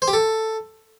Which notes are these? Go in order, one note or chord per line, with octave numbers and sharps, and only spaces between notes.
C5
G4
A4